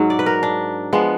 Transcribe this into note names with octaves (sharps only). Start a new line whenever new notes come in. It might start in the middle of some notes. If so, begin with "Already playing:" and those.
Already playing: G#2 F#3
D5
B4
A#4
D4
F3 G#3 B3